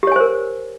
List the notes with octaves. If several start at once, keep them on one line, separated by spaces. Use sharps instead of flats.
G4 A#4 C5 C#5 G#5